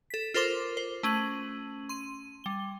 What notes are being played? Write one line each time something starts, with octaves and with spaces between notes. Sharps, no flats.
A4 B6
F4 A4 A#4 C5 C6 D6
C5
A3 C#4 D#7 F#7
C6 D#7
G3 G7